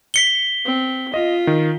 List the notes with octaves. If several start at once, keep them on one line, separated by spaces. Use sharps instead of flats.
B6 C#7 G7
C4
F4 D#5
D#3